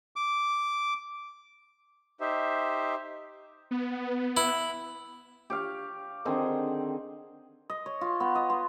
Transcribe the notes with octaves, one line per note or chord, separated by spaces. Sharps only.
D6
D#4 G4 C5 E5
B3
E4
G4 C#5 F5
D3 D#3 C4 G#4
D#5
C#5
F4
B3
D#5
C6